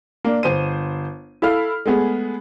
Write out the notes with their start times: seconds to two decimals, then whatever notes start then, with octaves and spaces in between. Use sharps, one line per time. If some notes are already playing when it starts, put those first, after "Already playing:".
0.24 A#3 D4
0.43 G1 C5 D#7
1.42 E4 A4 F5 F6
1.86 G#3 A3 B3 G#4